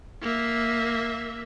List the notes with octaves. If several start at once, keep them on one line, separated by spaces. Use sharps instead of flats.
A#3 E5